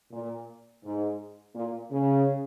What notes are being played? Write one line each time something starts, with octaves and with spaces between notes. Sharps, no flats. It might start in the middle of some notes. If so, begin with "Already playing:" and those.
A#2
G#2
A#2
C#3